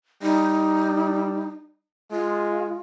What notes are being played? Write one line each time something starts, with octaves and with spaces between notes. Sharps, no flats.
G3 D#4
G#3 F4